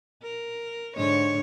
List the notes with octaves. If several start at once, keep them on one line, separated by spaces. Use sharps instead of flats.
A#4
G#2 D3 C#5